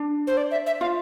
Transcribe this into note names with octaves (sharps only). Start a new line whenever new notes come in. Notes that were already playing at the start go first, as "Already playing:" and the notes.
Already playing: D4
C5
D5
E5
E5
F4 F5